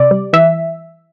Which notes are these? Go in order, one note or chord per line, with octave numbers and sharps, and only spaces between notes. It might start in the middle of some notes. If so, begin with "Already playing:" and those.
Already playing: C3 D5
G3
E3 E5